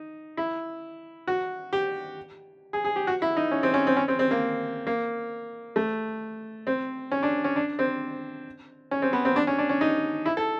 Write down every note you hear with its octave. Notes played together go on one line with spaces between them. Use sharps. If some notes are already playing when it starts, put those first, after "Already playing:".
Already playing: D#4
E4
F#4
G4
G#4
G#4
G4
F#4
E4
D#4
C#4
C4
C#4
C4
C#4
C4
C4
A#3
A#3
A3
C4
C#4
D4
C#4
D4
C4
C#4
C4
B3
C4
D4
C#4
D4
C#4
D#4
E4
A4